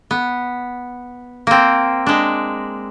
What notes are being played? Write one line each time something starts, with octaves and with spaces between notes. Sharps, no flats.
B3
A#3 C4
G#3 D4